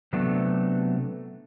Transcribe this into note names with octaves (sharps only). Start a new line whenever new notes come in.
C3 F#3 A3 B3 D4